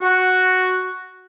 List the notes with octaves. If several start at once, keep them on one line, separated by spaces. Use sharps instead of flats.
F#4